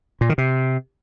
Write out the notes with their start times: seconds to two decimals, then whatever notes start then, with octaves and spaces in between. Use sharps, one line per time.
0.21 A#2
0.29 D#3
0.38 C3